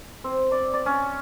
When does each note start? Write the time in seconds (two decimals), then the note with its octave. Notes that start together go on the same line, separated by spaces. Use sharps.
0.24 C4
0.52 D5
0.74 D5
0.86 C#4